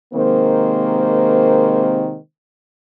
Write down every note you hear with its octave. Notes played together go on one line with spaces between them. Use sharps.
C3 D#3 G#3 A#3 C4 C5